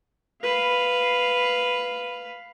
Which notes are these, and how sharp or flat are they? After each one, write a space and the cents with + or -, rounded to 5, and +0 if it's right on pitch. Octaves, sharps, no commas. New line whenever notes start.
B4 +0 F5 +0